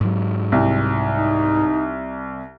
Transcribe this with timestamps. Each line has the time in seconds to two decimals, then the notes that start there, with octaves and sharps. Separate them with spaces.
0.01 G#2 F#3
0.52 C2
1.08 D#4